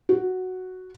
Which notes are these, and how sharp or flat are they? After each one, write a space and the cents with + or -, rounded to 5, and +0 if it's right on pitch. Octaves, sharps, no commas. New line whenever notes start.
F#4 +0